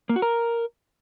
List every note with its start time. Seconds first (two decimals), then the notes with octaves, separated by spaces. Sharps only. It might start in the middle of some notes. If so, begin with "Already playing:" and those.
0.09 A#3
0.16 F#4
0.22 A#4